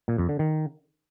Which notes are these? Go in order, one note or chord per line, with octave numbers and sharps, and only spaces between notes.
A#2
F2
D3
D#3